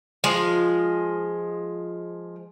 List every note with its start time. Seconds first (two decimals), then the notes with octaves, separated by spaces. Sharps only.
0.24 F3 G#3